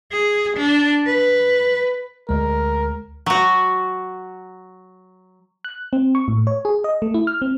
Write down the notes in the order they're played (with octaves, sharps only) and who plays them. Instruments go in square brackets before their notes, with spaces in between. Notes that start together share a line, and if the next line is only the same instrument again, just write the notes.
[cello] G#4
D4
B4
[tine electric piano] D2 G#3 [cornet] A#4
[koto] F#3 F#4
[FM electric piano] F#6
C4
C#6
A2
C#5
G#4
D#5
A3
E4
F6
C4